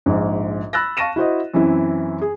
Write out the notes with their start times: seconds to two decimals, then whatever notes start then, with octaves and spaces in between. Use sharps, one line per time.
0.06 A#1 G#2
0.73 B5 E6 F#6 A6 A#6
0.97 F5 A5 C#6 A#6 D#7 E7
1.16 E4 F#4 C5 D#5
1.54 F#2 E3 C4 E4
2.21 G#4